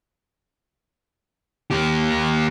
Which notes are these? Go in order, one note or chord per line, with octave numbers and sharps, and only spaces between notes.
D#2 G4